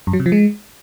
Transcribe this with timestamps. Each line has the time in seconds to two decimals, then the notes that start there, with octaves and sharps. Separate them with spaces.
0.07 F#2
0.13 F#3
0.20 C3
0.26 F3
0.32 G#3